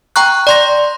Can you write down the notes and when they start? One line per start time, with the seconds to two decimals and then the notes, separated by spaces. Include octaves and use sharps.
0.16 G5 A#5 C#6 F#6
0.47 D5 C6 A#6